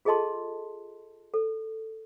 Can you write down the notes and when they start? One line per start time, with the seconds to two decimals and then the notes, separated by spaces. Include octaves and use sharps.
0.05 F4 G#4 A4 D#5 A5 C6
1.34 A4